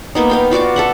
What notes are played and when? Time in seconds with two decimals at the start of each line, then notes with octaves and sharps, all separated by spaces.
0.15 A#3 B3 D#4
0.30 B3 F5 G5
0.51 F4 F#4 D5 D6
0.76 A4 E5 F#5